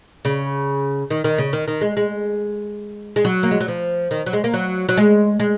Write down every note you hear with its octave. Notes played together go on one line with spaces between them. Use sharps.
C#3
D#3
D#3
C#3
D#3
D#3
G#3
G#3
G#3
F#3
A#3
G#3
F#3
F3
D#3
F#3
G#3
A#3
F#3
F#3
G#3
G#3